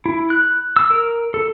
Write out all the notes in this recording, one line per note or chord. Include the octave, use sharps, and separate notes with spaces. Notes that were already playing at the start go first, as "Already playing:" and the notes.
E4
F#6
E6
A#4
A4